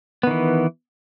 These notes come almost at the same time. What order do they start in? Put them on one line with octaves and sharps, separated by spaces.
B3 D#3 E3